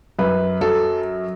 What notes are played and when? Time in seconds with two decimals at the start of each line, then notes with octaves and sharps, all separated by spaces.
0.19 F#2 B4
0.61 F#3 A4